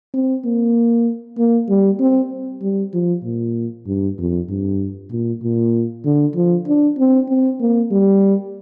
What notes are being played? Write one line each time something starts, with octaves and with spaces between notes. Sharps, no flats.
C4
A#3
A#3
G3
C4
G3
F3
A#2
G2
F2
G2
A#2
A#2
D3
F3
D4
C4
C4
A#3
G3